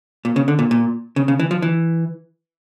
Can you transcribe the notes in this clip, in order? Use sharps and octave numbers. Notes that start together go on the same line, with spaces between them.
A#2
C#3
D3
A#2
A#2
C#3
C#3
E3
F3
E3